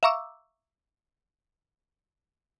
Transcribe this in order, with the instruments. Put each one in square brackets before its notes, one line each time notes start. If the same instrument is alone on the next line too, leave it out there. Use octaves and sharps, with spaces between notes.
[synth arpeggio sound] E5 F5 A#5 C#6 D6 E6